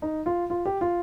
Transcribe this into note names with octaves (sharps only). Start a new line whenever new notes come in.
D#4
F4
F4
G4
F4